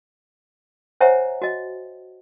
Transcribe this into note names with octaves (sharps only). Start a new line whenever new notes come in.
C5 C#5 E5 F#5 G#5 A#5
F#4 D#5